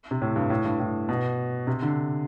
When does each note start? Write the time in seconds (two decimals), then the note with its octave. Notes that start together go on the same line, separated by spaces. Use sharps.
0.11 C3
0.22 A2
0.36 G2
0.50 A2
0.65 G2
0.80 A2
1.09 B2
1.67 C3
1.82 D3